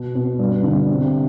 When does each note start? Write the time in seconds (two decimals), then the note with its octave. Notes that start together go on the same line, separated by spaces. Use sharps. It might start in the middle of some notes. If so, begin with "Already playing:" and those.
Already playing: B2
0.15 B2
0.39 G2
0.63 D3
0.88 C3